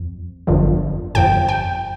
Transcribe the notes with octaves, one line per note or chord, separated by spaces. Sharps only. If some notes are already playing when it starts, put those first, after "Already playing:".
Already playing: F2
G1 F2 D3 F3
G1 F2 F3 G5
G5